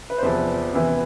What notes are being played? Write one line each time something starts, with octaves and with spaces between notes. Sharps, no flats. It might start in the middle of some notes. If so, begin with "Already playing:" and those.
B4
C5
E2 C3 F3 B4
C3 E3 B3